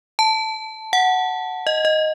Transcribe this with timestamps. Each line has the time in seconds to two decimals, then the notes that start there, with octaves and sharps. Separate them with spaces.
0.19 A5
0.93 F#5
1.67 D#5
1.85 D#5